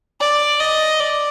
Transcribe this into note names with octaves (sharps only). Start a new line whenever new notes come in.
D5
D#5
D5